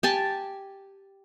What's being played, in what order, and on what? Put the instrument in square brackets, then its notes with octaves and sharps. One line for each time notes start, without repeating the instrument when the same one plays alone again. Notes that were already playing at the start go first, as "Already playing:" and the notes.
[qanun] G4 G#5 A5